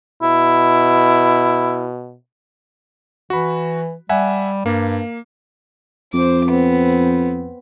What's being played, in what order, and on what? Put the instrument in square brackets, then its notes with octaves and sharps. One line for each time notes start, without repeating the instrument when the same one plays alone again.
[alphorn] B2 [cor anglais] E4
[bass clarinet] E3 [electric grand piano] F#4 B5
[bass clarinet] G3 [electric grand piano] E5 F#5 G#5
[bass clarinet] G2 [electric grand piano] A#3
[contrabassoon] F2 [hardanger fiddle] C5 D6
[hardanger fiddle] B3 C4